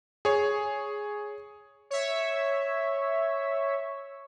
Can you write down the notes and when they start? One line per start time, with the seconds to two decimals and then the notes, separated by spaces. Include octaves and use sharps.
0.25 G#4 C#5
1.90 C#5 E5